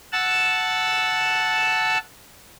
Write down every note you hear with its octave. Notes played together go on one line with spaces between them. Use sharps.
F#5 A5 E6